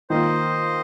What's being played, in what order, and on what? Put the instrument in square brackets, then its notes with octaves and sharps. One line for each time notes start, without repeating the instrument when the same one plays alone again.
[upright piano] D#3 A#3 F4 [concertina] C5 D#5